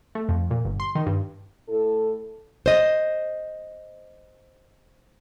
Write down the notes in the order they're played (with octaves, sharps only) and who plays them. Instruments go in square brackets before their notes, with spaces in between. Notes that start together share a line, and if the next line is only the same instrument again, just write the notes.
[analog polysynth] A3
F2
A#2
G1
C6
D#3
G2
[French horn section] A2 E4 A4
[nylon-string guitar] C5 D#5